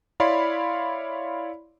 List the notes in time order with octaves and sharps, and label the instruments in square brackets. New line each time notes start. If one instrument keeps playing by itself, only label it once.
[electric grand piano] E4 C#5 D5 F5 B5 C6